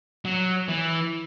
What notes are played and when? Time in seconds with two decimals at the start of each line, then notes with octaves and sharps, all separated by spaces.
0.25 F#3
0.69 E3